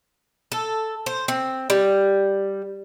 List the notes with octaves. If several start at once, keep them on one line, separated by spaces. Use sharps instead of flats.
A4
C5
C4
G3